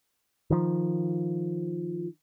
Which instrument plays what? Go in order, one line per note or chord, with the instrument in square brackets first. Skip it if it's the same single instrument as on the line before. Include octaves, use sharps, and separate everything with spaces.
[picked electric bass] D#3 F3